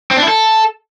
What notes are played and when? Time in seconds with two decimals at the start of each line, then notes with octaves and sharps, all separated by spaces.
0.11 C4
0.17 D4
0.22 E4
0.28 A4